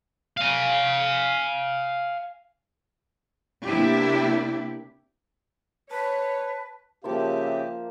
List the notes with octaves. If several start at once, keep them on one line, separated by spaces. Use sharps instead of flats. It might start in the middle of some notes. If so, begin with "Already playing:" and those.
F5 G#5
C3 A#3 B3 D4 E4 G4
B4 C#5 A5
C#3 F3 A#3 G4 C5 E5